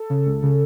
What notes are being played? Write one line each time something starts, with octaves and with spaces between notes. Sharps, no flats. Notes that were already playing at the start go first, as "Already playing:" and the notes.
Already playing: A4
C#3
C#2
C#3